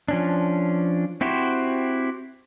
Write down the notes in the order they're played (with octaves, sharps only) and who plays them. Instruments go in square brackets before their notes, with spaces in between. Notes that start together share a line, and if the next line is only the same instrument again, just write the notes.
[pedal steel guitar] F3 C#4 D4
C4 E4 F#4 G4 C5